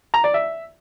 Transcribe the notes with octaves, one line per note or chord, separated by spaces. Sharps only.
A#5
D5
E5